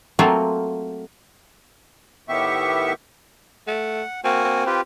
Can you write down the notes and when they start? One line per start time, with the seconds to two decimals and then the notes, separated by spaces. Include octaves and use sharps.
0.19 F#3 A3 A#3 C4 F4
2.29 A2 D#3 B3 G4 E5 C#6
3.68 A3 F#5
4.24 A#3 C4 F#4 G#5
4.44 C4
4.67 F4 G4 B4